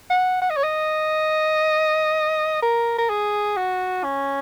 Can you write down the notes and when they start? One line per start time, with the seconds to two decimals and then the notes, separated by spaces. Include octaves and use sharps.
0.10 F#5
0.41 F#5
0.50 D#5
0.57 C#5
0.63 D#5
2.62 A#4
2.98 A#4
3.09 G#4
3.57 F#4
4.04 C#4